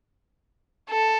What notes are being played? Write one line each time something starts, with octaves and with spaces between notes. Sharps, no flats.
A4